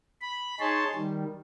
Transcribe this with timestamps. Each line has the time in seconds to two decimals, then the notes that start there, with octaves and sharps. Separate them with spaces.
0.22 B5
0.60 D#4 G#4 C#5 A5 C6
0.95 D#3 G3